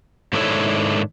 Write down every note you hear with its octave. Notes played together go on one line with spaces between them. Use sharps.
G#2 D#3 D4 E4 A4 C#5